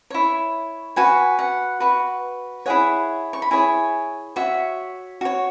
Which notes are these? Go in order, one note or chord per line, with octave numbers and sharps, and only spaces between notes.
E4 C#5
F#4 B4 G#5
F#5
F#4 B4
E4 G#4 C#5 F#5
C#6
B5
E4 G#4 C#5 G#5
F#4 C#5 E5
F#4 C#5